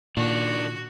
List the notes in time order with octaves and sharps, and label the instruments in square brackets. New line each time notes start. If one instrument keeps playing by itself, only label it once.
[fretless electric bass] A#2 [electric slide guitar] D#3 D4 [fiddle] F#4